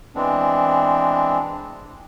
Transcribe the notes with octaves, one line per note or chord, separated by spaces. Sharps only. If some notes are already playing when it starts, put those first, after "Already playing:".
E3 G#3 B3 C4 D4